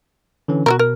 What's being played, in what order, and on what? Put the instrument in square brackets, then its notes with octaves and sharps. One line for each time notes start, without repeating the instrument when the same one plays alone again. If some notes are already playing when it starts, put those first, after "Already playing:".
[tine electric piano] D3 E3 C#4
[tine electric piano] B2 [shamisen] F#4 A4 A#4
[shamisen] A#4